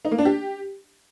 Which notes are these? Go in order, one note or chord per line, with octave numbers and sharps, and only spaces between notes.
D#4
A#3
D4
G4